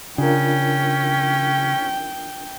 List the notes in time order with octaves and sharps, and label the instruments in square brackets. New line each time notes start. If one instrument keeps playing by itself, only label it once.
[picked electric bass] C#3 [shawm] C#4 [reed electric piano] D4 F4 A#4 [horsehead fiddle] G5